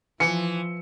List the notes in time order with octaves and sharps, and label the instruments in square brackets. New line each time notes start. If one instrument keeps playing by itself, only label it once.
[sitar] E3 [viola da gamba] F3 [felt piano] C#7